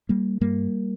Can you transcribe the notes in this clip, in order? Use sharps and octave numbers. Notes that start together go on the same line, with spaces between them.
G3 A#3
G2 G3 A#3